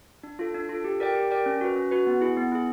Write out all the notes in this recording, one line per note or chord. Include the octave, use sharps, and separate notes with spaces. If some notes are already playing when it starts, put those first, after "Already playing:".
D4
F4 A4
D4
F4 A4
G4
A#4 D5 G5
G4
A#4 D5 G5
C#4
F#4 B4
C#4
F#4 B4
B3
E4 G#4
B3
E4 G#4